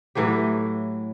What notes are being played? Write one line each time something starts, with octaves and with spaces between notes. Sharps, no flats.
A2 E3 F#3 G4